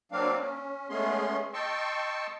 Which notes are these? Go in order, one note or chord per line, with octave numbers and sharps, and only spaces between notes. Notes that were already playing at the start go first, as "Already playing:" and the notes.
F#3 A#3 C4 D4 F5
C#4
G#3 A3 B3 C#4 G#4 C6
D#5 G5 A5 C6 C#6 E6